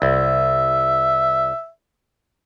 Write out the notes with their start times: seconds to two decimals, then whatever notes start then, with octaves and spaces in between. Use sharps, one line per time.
0.02 C2 E5